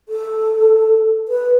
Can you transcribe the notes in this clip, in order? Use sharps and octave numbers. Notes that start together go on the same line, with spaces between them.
A4
B4